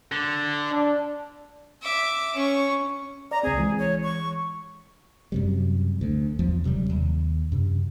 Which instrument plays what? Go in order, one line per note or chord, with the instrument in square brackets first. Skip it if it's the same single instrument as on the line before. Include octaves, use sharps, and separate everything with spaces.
[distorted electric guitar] D3
[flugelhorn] D4
[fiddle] E5 D6
C#4 C#6
[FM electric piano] D5 [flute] A#5
[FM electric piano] C#2 C4 [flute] G#4
[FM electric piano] E3 G#3
[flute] C#5
C#6
[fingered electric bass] F#2 C3 G3
D2
E2 F3
D#1 C3 F#3 G3
D#2
F#2 C3